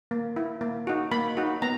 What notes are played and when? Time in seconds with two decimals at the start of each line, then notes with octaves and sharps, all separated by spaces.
0.11 A#3
0.36 E4
0.61 A#3
0.87 D#4 F#4
1.12 A#3 B5
1.37 D#4 F#4
1.62 B3 A#5